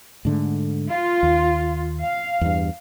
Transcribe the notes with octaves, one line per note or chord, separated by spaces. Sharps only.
G#2 D3 A3
F4
D#2
F5
E2 G2